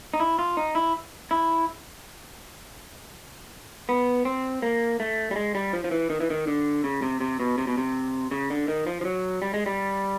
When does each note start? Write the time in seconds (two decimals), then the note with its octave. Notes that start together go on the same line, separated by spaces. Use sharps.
0.14 D#4
0.20 E4
0.39 F4
0.57 D#4
0.75 E4
1.31 E4
3.89 B3
4.25 C4
4.62 A#3
5.00 A3
5.31 G3
5.36 G#3
5.55 G3
5.73 F3
5.84 F3
5.91 E3
6.10 D#3
6.20 E3
6.30 D#3
6.47 D3
6.84 C#3
7.02 C3
7.20 C3
7.40 B2
7.58 C3
7.67 B2
7.77 C3
8.31 C#3
8.50 D3
8.68 D#3
8.87 F3
9.01 F3
9.05 F#3
9.42 G3
9.54 G#3
9.66 G3